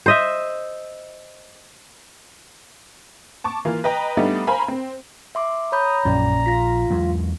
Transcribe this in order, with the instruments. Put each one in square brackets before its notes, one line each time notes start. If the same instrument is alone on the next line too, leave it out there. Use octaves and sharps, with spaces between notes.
[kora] C5 D#5 E5
[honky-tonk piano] A5 C#6 D6
E3 A#3 F4
B4 D#5 G5 A#5
G3 A3 B3 D4 D#4
A#4 C5 F5 G#5 A#5 B5
C4
[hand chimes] E5 C6 D6
[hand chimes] C#5 B5 G6 [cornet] A#5 [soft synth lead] D#6
[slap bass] A#1 F3 [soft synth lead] F#2 [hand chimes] C#4 D5
[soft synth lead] F4 [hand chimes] A#6 B6
[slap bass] E2 F#3 G#3